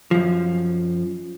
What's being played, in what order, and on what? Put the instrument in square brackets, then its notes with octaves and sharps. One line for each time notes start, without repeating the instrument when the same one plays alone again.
[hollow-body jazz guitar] F#2 F3